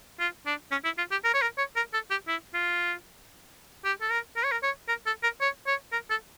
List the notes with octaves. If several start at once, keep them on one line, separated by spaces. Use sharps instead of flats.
F4
D4
C#4
E4
F4
G4
A#4
C#5
A#4
C#5
A#4
A4
G4
E4
F4
G4
A4
A#4
A#4
C#5
A#4
C#5
A#4
A4
A#4
C#5
C#5
A#4
A4